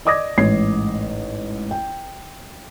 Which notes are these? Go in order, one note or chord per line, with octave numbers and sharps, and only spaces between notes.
D5 D#5 D6 D#6 G#6 A#6
A1 G#2 C#5 G#6 C7
G5